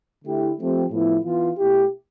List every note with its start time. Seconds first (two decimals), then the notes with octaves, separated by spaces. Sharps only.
0.24 D3 A3 E4 G4
0.57 F3 A3 C4 G4
0.90 A2 F3 B3 E4
1.23 E3 B3 F4
1.57 B2 A3 E4 G4